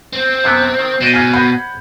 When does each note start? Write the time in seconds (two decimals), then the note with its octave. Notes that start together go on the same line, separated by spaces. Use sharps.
0.13 C4
0.44 F#2 C3 B3
0.79 D#3
1.01 B2 C5 D5 D#5
1.14 G#5 F6 G#6
1.33 F#5 B5 G6